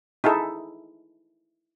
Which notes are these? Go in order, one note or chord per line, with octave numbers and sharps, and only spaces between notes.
D#4 E4 G#4 A4